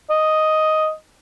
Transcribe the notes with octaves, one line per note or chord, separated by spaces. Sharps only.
D#5